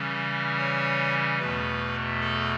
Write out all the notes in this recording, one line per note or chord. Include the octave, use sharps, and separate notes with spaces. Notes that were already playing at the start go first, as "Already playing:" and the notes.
Already playing: C#3 E3 G3 C#4
C#5
E2 B2 A3 B4
A4